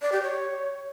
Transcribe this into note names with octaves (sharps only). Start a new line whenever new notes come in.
D5
G4
C#5